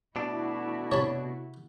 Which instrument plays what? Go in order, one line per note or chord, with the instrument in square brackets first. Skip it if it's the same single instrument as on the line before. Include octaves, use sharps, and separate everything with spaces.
[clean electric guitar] B2 D4 [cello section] A3 E4 F#4
[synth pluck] C3 [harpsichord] C#5 A5 B5